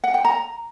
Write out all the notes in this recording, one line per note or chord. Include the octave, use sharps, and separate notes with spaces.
F#5
G5
A#5